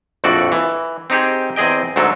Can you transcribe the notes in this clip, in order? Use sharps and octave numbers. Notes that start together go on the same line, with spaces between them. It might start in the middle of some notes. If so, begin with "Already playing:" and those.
A#1 F2 A2 F#4 A4 D5
E3
C4 D#4 G4 G#4
E2 C4 G#4 D#5 G5
D2 G#2 F#3 A4